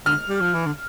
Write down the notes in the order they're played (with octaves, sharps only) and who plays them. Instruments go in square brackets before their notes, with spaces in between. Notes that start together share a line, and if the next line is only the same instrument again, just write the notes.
[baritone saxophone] D3 [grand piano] F6
[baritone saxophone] G3
F3
E3
D3